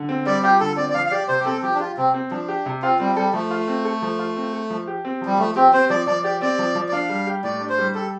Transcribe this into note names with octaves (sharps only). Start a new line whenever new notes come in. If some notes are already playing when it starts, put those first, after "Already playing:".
Already playing: D3
C4
G3 D5
F4 G4
D3 A4
C4 D5
D5
F3 F5
F5
G4 D5
C3 C5
G4
C4 A4
F3 G4
D4
F4 G4
C3 C4
C4
F3 D4
G4
C3
C4 F4
G3 C4
G3 A4
F3 A3
F4
C4
A4
F3
F4
C4
A4
F3
G4
C4
F3 G3
F3 A3
C4 G4
C4 C5
F3 D5
F3 D5
G4 D5
C4 D5
F3
F3
D5
D4 F5
G3
G4
A2 D5
D4
C5
G3
G4 A4